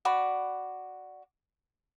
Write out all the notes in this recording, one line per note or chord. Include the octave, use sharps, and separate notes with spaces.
F#4 D5 B5